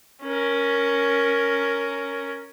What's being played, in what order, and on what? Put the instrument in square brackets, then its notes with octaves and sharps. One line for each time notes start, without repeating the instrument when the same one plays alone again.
[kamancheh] C#4 A#4